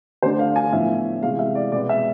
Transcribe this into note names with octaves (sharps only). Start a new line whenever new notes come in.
D3 A3 D4 C5
F5
G#5
A2 F3 B3 D4 E5
C3 E3 G#3 F5
E5
D5
B2 G#3 B3 D5
E5